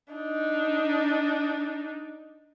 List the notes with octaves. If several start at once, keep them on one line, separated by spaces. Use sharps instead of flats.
D4 D#4